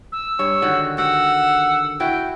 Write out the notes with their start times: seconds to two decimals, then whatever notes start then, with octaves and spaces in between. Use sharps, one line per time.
0.12 E6
0.39 G2 C#5
0.62 D3 D#3 F#4
0.98 F#4 G4 F#5 E6
2.00 E4 F#4 G5